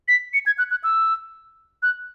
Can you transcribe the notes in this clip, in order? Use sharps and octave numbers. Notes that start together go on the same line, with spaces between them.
B6
C#7
G#6
F#6
F#6
E6
F#6